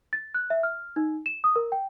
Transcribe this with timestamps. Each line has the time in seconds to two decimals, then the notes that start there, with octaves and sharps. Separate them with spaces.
0.13 A6
0.34 F#6
0.50 E5
0.63 F6
0.96 D#4
1.26 E7
1.44 D#6
1.56 A#4
1.72 G5